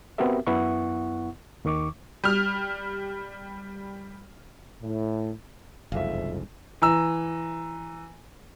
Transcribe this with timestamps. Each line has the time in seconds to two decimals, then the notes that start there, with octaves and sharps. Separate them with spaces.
0.18 B3 C4 F#4 G4 A#4 E5
0.47 F#2 B3 E4 F#5 C#6
1.65 D#2 D#3 C#6 D6
2.24 G3 F6
4.81 A2
5.92 F#1 C2 F2 G#2 E5 F5
6.82 E3 A#5 E6